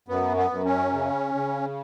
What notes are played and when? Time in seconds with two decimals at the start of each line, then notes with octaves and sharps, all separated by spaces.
0.08 F#2 B3
0.37 B3
0.51 F#2
0.65 C#4
0.93 C#3
1.35 C#3